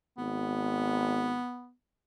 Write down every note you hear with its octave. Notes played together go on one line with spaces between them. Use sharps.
G#1 B3